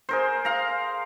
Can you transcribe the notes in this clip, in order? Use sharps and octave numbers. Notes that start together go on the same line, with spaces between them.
G#4 A#4 C5
F5 A#5